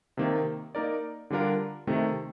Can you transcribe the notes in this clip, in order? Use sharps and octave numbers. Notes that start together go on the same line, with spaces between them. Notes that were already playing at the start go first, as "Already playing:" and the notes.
C3 D#3 A#3
A#3 D#4 A#4 D5
D3 G3 D4 F4 A#4
C3 D#3 A3